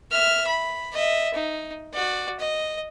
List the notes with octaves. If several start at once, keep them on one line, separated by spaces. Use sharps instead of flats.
E5 F6
B5
D#5 E5
D#4
F#4 D5
D#5